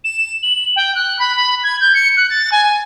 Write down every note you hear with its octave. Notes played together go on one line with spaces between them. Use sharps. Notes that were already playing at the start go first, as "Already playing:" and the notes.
E7
F#7
G5
F#6
B5
B5
G#6
G6
C#7
F#6
A6
G#5